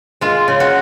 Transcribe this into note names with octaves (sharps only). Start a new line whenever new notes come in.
G#3 F4
C#3
F#4